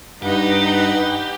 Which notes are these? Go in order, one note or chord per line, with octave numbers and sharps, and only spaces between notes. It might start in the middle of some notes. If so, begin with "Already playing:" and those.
G2 D#4 G4 B4 F#5